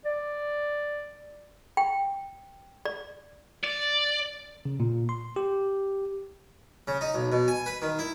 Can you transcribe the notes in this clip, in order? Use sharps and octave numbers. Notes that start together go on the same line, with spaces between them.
D5
G5
D5
D5
C#3
A#2
C6
G4
C#3
D#4
B1
B2
G#5
B4
D#3
E4